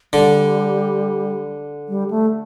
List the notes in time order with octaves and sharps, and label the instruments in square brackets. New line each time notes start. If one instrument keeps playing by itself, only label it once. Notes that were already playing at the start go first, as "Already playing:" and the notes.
[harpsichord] D3 [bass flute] G3
[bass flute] G3
A3